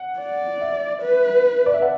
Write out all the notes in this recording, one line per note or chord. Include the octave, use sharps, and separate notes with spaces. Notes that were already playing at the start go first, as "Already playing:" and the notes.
Already playing: F#5
D5
E5
B4
D5
E5
F#5